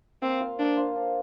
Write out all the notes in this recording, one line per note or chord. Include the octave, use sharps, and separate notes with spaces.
A#3 C4
F4 C5 F5
A#3 D4
F4 C5 F5
D4